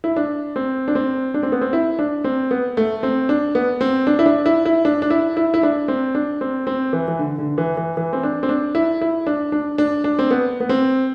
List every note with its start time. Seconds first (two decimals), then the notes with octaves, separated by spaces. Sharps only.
0.04 E4
0.16 D4
0.56 C4
0.88 D4
0.95 C4
1.34 D4
1.43 C4
1.52 B3
1.61 C4
1.73 E4
1.99 D4
2.24 C4
2.51 B3
2.77 A3
3.03 C4
3.29 D4
3.55 B3
3.81 C4
4.07 D4
4.19 E4
4.26 D4
4.46 E4
4.65 E4
4.85 D4
5.02 D4
5.10 E4
5.37 E4
5.54 E4
5.63 D4
5.88 C4
6.15 D4
6.41 C4
6.67 C4
6.93 E3
7.08 E3
7.19 D3
7.39 D3
7.58 E3
7.77 E3
7.97 E3
8.13 C4
8.23 D4
8.43 C4
8.49 D4
8.75 E4
9.01 E4
9.27 D4
9.52 D4
9.78 D4
10.04 D4
10.19 C4
10.31 B3
10.60 B3
10.69 C4